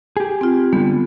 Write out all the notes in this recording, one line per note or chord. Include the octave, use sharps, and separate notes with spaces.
G4 G#4
C4 F4
D3 G3 B3